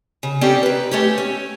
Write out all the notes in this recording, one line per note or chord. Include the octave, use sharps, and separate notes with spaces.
C#3
C4 C#4 G4 A4 D5
D#2 B4
A3 C#4 G4
C#4